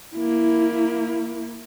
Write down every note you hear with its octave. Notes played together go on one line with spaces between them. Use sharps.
A#3 E4